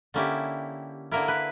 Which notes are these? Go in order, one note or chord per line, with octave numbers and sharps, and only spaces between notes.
D3 A#3 C#4 E4 G4
D3 A#3 E4 A#4
B4